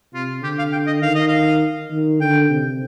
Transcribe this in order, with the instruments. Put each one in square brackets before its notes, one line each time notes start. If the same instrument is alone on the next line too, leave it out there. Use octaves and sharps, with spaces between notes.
[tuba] C3 [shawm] F4
[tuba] D3 [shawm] G4
[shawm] F5
G5
D#5
[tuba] D#3 [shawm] F5
[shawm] D#5
F5
[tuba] D#3
[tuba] D3 [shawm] G5
[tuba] C3